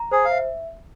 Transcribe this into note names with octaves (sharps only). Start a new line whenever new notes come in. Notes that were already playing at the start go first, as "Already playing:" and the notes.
Already playing: A#5
G#4 C5
F5
E5